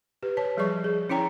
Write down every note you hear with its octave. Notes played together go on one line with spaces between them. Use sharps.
G4 B4
C#5 A5
F3 G3 G#4 C#5 D5 C#6
G#4
C#4 E4 C#5 G5 A#5